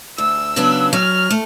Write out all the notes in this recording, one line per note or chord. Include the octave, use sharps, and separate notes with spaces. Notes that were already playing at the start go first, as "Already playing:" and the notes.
D2 E6
C#3 F#3 B3 D4
F#3 F6
A3